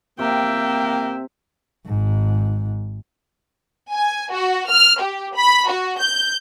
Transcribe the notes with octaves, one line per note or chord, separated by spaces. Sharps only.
C3 A#3 E5 G5
G#1 G#2
G#5
F#4
F6
G4
B5
F#4
G6